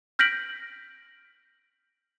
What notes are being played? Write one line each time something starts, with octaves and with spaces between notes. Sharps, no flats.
F6 G6 A#6 B6 D7 F#7